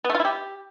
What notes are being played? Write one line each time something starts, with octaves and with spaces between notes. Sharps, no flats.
B3
A3
F4
E4
G4